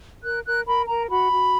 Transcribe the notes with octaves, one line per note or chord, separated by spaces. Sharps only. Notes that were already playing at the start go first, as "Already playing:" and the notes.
A#4 F#6
A#4 F#6
A#4 B5
A#4 A#5
F#4 B5
F#4